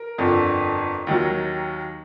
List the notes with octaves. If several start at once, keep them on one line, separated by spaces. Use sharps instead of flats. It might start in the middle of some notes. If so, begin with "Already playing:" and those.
Already playing: A#4
G1 F2 D3
D#2 D#3 F#3